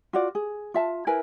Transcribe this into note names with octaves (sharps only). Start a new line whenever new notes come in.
F4 F#4 D5
G#4
F4 E5 A5
E4 A#4 B4 G#5